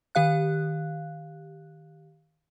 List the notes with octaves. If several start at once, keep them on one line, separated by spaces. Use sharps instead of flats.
D#3 G4 F5 F#6